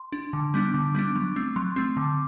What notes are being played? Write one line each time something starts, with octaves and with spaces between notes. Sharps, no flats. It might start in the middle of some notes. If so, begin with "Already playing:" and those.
Already playing: C6
D4
D3
G3 B3 D4
D3 D6
G3 B3 D4
F#3
A3 C4
F#3 C6
A3 C4
D3 D6